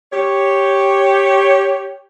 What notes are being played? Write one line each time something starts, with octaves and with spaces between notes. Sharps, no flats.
G4 C#5